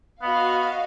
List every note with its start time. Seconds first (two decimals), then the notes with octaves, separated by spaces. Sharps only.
0.22 B3 F#4 D#5 F5